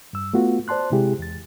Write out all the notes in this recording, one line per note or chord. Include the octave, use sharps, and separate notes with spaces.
G2 E6
A3 B3 F4 F#4
C5 D5 A5 C6 F#6
C3 G#3 E4 G4 G#4
E2 A6